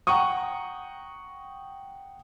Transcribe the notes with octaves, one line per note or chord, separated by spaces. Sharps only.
F#5 G5 A#5 C#6 D#6